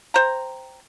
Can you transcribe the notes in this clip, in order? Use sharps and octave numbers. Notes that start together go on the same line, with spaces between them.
C5 G5 A#5